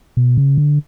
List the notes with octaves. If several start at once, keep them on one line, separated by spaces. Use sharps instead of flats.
B2
C#3
D3